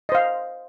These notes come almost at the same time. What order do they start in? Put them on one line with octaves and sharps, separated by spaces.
D#5 C5 F5